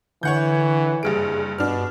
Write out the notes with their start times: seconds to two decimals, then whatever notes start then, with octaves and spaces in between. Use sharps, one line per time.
0.23 D3 E3 C#5 F#5 G6
1.03 F#1 G2 G#4 D7
1.58 G2 B2 D4 F6